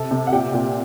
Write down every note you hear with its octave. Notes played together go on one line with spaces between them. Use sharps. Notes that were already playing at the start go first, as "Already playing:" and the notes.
Already playing: C3 A4 A5
C3
F#5
A#2 G4 G5
A#2